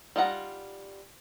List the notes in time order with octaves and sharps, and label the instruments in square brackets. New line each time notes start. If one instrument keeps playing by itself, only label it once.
[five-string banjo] G3 D#4 F4 F#5 A#5